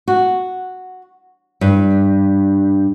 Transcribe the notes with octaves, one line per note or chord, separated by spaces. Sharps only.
F#4
G2